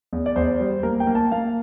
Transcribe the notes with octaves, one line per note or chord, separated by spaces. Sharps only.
E2
D5
E2 C5
G3
A#3 A#4
G5
A#3
A5
A#3 F5